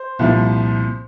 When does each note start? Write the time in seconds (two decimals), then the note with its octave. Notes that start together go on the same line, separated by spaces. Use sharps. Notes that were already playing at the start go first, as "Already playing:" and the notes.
Already playing: C5
0.19 C2 A#2 F3